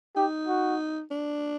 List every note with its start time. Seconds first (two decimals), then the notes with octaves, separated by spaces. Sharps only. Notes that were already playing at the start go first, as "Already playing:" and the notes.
0.16 D#4 G4
0.48 F#4
1.11 D4